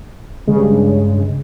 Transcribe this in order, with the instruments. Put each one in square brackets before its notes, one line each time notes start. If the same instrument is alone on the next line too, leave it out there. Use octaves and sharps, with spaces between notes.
[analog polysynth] G2 C#3 [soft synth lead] G#3